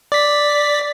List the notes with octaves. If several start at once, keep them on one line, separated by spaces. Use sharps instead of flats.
D5 B6